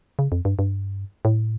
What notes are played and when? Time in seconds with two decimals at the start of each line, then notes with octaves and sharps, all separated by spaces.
0.19 C#3
0.32 F2
0.45 G2
0.59 G2
1.25 A2